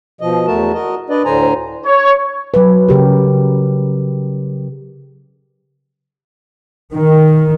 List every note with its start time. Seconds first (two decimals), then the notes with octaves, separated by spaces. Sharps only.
0.21 B2 F3 D#5
0.47 E2 A3 F#4 A#4 A5
0.74 F#4 A#4 D#5
1.10 D4 B4 D5 D#5
1.25 D2 A2 D3 C5 G#5 A#5
1.86 C#5
2.54 F#3 B4
2.88 C#3 G4 A#4
6.94 D#3